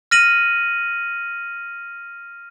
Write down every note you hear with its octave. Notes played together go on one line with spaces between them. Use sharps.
F6 A#6 D#7 F#7